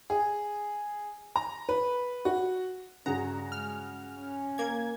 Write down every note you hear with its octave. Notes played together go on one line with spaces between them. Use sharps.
G#4
A#5
B4
F#4
G2 C#3 F#4 G#4 A#5
G#3 F6
C#4
A#3 G#6